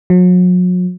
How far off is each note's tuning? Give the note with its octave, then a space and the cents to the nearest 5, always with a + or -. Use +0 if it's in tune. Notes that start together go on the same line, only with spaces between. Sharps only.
F#3 -40